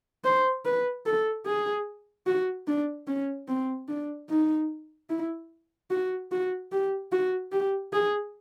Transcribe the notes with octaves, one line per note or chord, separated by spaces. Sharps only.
C5
B4
A4
G#4
F#4
D4
C#4
C4
D4
D#4
E4
F#4
F#4
G4
F#4
G4
G#4